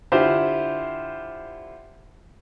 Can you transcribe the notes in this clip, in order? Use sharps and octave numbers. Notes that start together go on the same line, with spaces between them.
D3 E4 F4 G4 C5